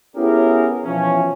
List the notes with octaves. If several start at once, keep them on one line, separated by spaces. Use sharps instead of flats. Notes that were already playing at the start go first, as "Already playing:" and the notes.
B3 C#4 E4 G4 G#4 A#4
B2 E3 F3 C#4